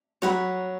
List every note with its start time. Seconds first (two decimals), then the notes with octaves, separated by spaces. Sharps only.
0.22 F#3 C#5 F#5 B5